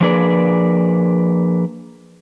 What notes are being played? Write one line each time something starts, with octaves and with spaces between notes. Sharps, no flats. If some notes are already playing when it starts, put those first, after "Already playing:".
F3 A#3 D4 G#4 B4 D5